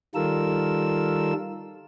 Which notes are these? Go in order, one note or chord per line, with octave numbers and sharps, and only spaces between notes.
D#3 G3 F4 A4 A#4 E6